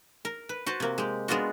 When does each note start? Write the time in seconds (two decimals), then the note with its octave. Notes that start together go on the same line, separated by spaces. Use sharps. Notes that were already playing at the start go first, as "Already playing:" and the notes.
0.25 A#4
0.49 B4
0.66 F#4 B4 C5 A5
0.80 C3 A#3
0.98 G#3 G4
1.28 G#3 B3 D4 F4 F#4